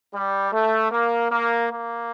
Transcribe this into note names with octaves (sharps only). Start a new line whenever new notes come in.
G3
A3
A#3
A#3
A#3